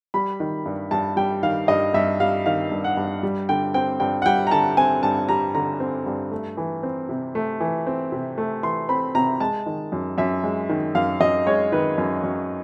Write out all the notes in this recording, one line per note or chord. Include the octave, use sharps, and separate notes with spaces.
G3 B5
D#3
G2
G2 A5
G3 G5
D#3 F5
G2 D#5
G2 E5
G3 F5
D#3 F5
G2
F#5
G2
G3
D3 G5
C4 G5
G2 G5
F#5
G3 G5
A#5
D3 A5
C4 G#5
G2 A5
G3 A#5
D3 A#5
C4
G2
A3
E3
C4
C3
A3
E3
C4
C3
A3
E3 C6
C4 B5
C3 A#5
G#3 A5
D#3
F#2
F#2 E5
G#3
D#3
F#2 F5
F#2 D#5
G#3 C#5
D#3 B4
F#2
F#2